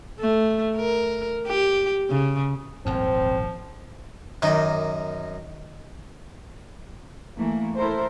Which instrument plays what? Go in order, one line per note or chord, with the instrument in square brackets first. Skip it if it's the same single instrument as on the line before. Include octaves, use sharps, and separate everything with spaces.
[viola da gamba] A3
A#4
G4
C#3
[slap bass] D#1 G#1 E2 [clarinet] F3 [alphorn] C4
[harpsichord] F#2 D#4 [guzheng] D#3 D5
[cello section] E3 A3 A#3
E4 A4 A#4 C5